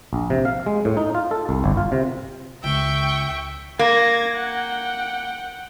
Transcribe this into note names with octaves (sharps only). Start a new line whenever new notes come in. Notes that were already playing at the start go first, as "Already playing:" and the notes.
A#1
C3
F5
G#3
A2
D#4
F4
A4
C2
G1
F4
C3
C#2 E5 G5 C#6
A#3 G#6 A#6
F#5 G5